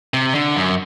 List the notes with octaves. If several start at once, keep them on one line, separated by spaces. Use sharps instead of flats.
C3
D3
F#2